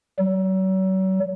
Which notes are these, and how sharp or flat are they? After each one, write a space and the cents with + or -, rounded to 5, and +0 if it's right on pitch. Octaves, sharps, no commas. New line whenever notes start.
F#3 +40